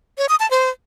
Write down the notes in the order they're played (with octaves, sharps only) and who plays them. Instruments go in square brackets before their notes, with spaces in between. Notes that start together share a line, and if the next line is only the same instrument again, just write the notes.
[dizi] C#5
D#6
A5
C5